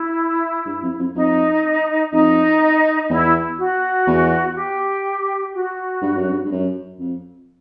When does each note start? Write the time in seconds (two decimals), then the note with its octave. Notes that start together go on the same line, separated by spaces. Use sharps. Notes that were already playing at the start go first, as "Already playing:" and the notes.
Already playing: E4
0.66 G2
0.82 F2
0.99 F2
1.15 F2 D#4
2.12 F2 D#4
3.10 E2 E4
3.59 F#4
4.07 E2
4.56 G4
5.54 F#4
6.02 G2
6.16 F#2
6.30 G2
6.45 G2
6.51 F#2
6.99 F2